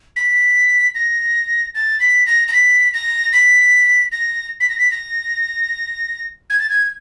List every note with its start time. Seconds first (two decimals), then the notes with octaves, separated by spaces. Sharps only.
0.16 B6
0.95 A#6
1.75 A6
2.00 B6
2.26 A#6
2.48 A#6
2.53 B6
2.94 A#6
3.33 B6
4.12 A#6
4.60 B6
4.69 A#6
4.78 B6
4.91 A#6
6.50 G#6
6.59 A6
6.69 G#6